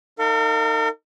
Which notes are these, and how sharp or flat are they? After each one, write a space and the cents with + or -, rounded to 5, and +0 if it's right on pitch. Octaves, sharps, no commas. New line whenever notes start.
D#4 +0 A#4 -45 F5 +0